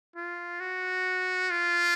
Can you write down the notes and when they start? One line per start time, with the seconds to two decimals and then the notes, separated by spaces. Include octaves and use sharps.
0.16 F4
0.60 F#4
1.50 F4